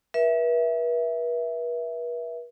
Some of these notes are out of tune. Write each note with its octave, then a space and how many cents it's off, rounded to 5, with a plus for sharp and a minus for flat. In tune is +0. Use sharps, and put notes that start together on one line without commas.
B4 -45 E5 +0